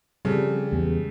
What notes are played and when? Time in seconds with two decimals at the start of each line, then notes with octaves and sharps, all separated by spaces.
0.25 C#3 F3 G3 C4 A4
0.73 E2 G#3 B3 G#4